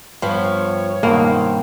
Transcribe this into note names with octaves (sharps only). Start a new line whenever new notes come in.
G2 F3 B3 C#5
G2 B2 D#3 A#3 C4